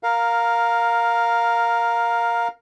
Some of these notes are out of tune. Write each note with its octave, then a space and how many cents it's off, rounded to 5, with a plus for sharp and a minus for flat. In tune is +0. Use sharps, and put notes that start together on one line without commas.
A#4 +0 F5 +10